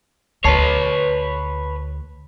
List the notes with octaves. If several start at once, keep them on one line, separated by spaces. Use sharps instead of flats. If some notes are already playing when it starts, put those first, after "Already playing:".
D2 B4 C#5 A5 C7